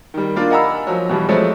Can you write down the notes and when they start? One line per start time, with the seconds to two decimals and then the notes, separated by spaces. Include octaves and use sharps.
0.14 D#3 G3
0.36 A#3 D4 F4 D5
0.50 D#5 F#5 G#5 A#5 B5 E6
0.87 F3 F#3
1.09 B2 E3 G3
1.29 F3 G#3 A3 C4 A4 C#5